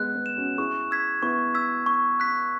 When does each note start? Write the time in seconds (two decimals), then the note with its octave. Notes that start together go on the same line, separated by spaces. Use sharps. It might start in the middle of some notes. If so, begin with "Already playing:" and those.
Already playing: G#3 B3 F#6
0.15 B3
0.26 E7
0.36 C#4 F#4
0.58 E4 G#4 C#6
0.91 E6 G#6 B6
1.22 B3 E4 C#6
1.54 E6 G#6 B6
1.86 C#6
2.20 F#6 B6